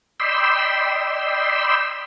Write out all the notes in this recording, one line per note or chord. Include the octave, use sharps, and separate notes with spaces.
D5 D#5 G5 B5 C6 E6